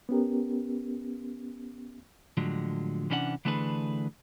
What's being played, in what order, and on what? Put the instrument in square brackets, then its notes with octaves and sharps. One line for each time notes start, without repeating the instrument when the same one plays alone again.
[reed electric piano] B3 C#4 G4 A#4
[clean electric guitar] A2 D3 F3 F#3 G#3
C3 E3 C#4 D4 C5 F#5
D3 E3 A3 D4 G#4 B4